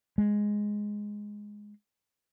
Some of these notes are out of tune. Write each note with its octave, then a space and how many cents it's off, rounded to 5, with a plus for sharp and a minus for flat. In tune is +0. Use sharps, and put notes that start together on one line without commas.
G#3 +0